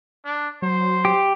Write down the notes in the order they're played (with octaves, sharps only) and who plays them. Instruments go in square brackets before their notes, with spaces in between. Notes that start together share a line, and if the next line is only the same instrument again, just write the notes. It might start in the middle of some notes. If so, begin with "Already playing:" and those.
[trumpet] D4
[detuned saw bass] F#3 [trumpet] C5
[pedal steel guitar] G4